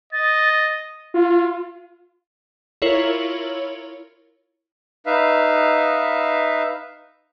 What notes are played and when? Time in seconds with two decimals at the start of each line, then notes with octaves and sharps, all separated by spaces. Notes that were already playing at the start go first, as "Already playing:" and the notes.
0.13 D#5 A6
1.14 F4
2.82 E4 F4 A#4 C#5 F#7
5.06 D#4 B4 E5 F5